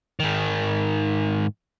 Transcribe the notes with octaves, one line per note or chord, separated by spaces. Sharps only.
G#2 D#3